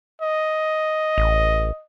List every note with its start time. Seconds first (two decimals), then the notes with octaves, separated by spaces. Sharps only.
0.22 D#5
1.18 A1